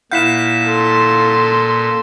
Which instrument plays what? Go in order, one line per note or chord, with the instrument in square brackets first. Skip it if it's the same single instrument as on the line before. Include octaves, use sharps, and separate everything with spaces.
[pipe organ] A#2 [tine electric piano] E4 F5 F#5 [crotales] G6 B6 E7
[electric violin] A4 C6